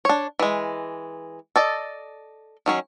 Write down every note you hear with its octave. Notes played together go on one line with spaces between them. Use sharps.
D4 C#5
E3 G#3
A4 D5 D#5
D#3 F#3 C#4